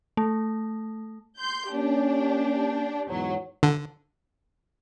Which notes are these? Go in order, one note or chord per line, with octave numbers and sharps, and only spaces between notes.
A3
C6 G6
A#3 C#4 D4 G4
E2 G#2 B2 F#3
D3